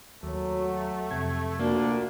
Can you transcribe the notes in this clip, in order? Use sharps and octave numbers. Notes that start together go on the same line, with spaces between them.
D#2 F#3 A3
F2 C3 G#6
D2 A#2 A#3 D4 F#4